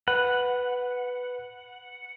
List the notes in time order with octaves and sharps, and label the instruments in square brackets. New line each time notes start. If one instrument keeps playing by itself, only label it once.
[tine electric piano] B4 [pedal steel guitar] F#5